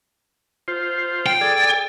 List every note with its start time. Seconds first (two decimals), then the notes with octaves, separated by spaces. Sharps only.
0.68 F4 C5
1.26 G5
1.41 G#4 A4 D5